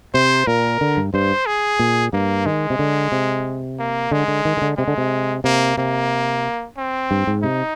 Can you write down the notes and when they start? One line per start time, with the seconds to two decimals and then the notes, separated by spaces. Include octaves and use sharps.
0.14 C3 C5
0.47 A#2 A#4
0.81 D3
0.97 G2
1.14 G2 C5
1.46 G#4
1.79 A#2
2.13 G2 A#3
2.46 D#3 G#3
2.70 C3
2.79 D3
3.12 C3
3.79 A#3
4.11 D3 G#3
4.28 D3
4.45 D#3
4.57 D#3
4.62 D3
4.78 C3 G#3
4.88 D3
4.98 C3
5.44 C3 A#3
5.77 C3 A#3
6.77 C4
7.11 G2
7.27 G#2
7.43 C3 D#4